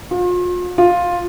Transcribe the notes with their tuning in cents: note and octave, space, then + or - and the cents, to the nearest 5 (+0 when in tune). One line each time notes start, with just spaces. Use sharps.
F4 +40
F4 +10